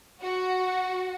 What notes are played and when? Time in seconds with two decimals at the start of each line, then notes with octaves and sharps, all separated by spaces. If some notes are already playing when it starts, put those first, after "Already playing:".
0.22 F#4